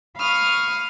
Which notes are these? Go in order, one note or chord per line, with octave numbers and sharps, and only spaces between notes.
F5 B5 C#6 D#6 F6